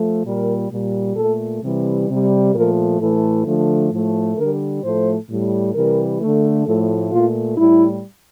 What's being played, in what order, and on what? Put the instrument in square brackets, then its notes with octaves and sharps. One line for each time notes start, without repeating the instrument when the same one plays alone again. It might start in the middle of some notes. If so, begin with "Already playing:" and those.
Already playing: [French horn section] F3 A3
A#2 G3 A#4
A#2 G3
A#2 A3 A4
C3 E3 G3
C3 G3
A#2 F3 A3 A#4
A2 E3 A3 A4
D3 F3 A3
A2 F3 A3
D3 G3 A#4
A2 F3 A3 C5
A2 G3
C3 E3 G3 A#4
D3 A3
A2 F3 A3 A4
A#2 A3 F4
A2 G3 E4